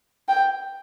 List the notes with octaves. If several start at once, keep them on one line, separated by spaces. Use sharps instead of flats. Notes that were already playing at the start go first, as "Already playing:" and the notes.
G5